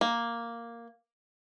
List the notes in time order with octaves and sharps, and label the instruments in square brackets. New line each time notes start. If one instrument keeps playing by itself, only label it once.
[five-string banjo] A#3